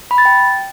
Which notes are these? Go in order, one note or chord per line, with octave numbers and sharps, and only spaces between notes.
B5
A6
G5